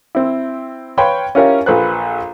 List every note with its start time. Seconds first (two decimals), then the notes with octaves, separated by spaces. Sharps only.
0.15 C4 E4
0.98 B4 C#5 F5 G5 B5 C6
1.35 C#4 E4 F4 G4 A#4 C#5
1.66 A#1 A4 B4 C5 F#6